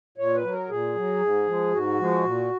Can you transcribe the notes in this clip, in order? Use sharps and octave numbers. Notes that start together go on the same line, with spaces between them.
A#2 C#5
B4
F#3
A#4
A#2 G#4
F#3
G#2
F3 G#3
G#2 F#4
F3 G#3
A#2